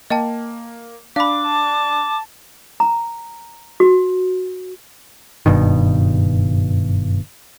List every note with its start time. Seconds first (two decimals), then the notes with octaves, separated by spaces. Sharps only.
0.10 A#3 D#5 G5 A5
1.16 D4 F5 B5 D6
1.47 A5
2.80 A#5
3.80 F#4
5.46 F#1 G2 B2 D#3